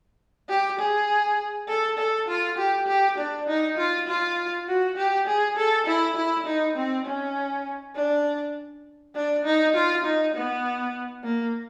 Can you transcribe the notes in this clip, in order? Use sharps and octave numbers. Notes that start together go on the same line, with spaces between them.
G4
G#4
A4
A4
F4
G4
G4
D4
D#4
F4
F4
F#4
G4
G#4
A4
E4
E4
D#4
C4
C#4
D4
D4
D#4
F4
D#4
B3
A#3